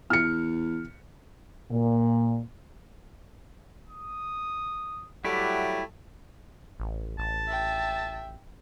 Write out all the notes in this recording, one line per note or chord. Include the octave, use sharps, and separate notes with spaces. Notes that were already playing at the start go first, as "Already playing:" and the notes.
E2 F6 C#7
A#2
D#6
F#3 G3 A3 E4 G4 F#5
A1
A1 A5
E5 G5